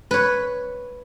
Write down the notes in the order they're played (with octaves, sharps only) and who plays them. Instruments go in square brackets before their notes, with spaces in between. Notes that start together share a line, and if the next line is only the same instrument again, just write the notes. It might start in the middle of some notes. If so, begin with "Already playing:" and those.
[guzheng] B4 C#5